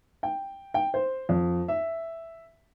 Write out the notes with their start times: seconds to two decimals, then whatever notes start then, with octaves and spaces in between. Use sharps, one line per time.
0.23 G5
0.74 G5
0.94 C5
1.29 F2
1.68 E5